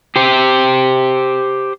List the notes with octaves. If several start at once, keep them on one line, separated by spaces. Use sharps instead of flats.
G4 C5